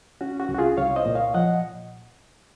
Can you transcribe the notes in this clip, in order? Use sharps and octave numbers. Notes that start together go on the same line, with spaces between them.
C#4 F#4
F#4
C2
F#4
F4 G#4
C2 C#5 F5
C5 D#5
A#2
C#5 F5
F3 D#5 F#5